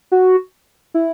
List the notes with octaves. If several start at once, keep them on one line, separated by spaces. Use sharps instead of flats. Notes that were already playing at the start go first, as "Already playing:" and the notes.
F#4
E4